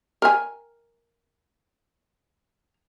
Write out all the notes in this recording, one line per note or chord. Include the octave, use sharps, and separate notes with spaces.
A#4 G#5